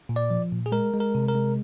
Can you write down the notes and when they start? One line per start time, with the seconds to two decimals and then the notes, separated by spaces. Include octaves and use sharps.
0.09 A#2
0.16 D5
0.31 F3
0.52 A#2
0.66 G#4
0.72 G#3 A#4
0.94 G#3
1.00 A#4
1.15 C3
1.28 A#4
1.35 G#3